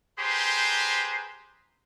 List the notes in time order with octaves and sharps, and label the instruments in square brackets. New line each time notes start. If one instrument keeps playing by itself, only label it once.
[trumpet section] G4 G#4 B4 C5 A#5 C6